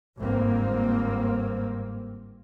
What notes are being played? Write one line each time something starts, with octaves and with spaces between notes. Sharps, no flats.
G1 G#2 A#3 C4